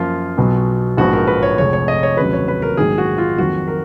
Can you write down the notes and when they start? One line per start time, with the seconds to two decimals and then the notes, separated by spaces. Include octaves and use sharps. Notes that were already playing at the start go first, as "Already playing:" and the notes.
Already playing: F#2 F3 A#3 F4
0.38 B1 B2 F#3 B3
0.97 A#1 G#2 F3 B3 F#4
1.13 A#4
1.27 B4
1.43 C#5
1.57 F1 F2 F3 G#3 C#5
1.73 C#5
1.88 D#5
2.03 C#5
2.17 F1 D#2 C#3 F#3 B4
2.33 C#5
2.48 B4
2.62 A#4
2.77 A#1 G#2 D#3 F#3 A#3 G#4
2.98 F#4
3.18 F4
3.38 F2 D#3 F#3 A#3 F#4
3.68 A#4